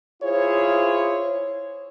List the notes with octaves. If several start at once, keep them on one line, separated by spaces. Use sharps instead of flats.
E4 F4 G#4 C5 C#5